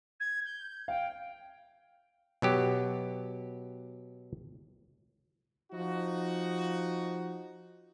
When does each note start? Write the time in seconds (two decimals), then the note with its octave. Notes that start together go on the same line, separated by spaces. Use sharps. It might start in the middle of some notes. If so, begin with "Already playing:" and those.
0.20 G#6
0.45 G6
0.88 F5 G5
2.42 B2 F#3 G4
5.71 F3 D#4 F#4